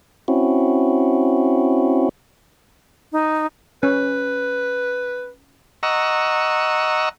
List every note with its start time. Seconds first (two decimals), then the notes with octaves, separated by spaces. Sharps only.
0.28 C4 C#4 E4 F#4
3.12 D#4
3.83 C#4 B4
5.83 D#5 F#5 A#5 C#6 E6